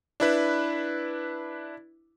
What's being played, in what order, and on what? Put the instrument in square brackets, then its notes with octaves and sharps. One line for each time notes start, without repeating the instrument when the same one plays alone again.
[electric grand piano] D4 E4 B4